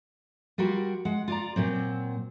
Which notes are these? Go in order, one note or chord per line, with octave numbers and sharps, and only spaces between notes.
G3 F4 F#4 A#4
G#3 F#5
F4 D5 A#5
A#2 F#3 C4